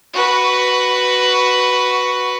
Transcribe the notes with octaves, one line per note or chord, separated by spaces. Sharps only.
F#4 B4